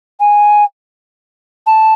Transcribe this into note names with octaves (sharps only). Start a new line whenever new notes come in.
G#5
A5